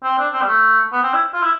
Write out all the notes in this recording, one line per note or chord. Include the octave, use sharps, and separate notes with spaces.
C4
D4
C4
G3
A3
B3
C4
E4
F4
E4